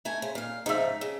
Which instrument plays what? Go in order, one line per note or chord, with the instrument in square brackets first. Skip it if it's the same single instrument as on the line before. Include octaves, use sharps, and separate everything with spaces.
[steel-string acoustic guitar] A3 A#4 G#5
C#3 C5
A#2 F5
[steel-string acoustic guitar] G#2 C#3 F3 [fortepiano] D#4 E5
[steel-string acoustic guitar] C#3